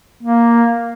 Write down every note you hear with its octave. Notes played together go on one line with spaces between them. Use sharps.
A#3